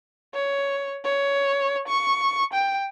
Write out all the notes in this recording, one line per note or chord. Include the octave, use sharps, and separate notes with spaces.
C#5
C#5
C#6
G5